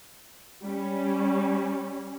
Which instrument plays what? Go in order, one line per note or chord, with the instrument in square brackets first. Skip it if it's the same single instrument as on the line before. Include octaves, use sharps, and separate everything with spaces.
[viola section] G3 C#4